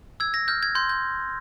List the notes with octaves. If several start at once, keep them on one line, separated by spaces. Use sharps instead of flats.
E6 G#6
A#6
F6 G6
G#6
C6 G6
G6